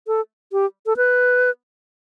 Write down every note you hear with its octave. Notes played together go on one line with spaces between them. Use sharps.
A4
G4
A4
B4